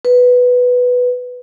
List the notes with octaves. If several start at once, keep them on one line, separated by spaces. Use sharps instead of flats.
B4